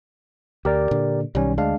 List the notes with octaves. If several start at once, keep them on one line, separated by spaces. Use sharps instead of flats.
D2 G4 A#4 D5
A#2 D3
B1 D#3 G3 C#4
D2 G#3 D4 F5